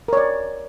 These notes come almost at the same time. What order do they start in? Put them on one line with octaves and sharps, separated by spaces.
A#4 C#5 D5